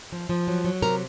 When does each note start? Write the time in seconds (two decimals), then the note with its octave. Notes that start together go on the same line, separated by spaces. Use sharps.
0.12 F3
0.29 F3
0.48 F#3
0.65 F#3
0.82 C3 A#4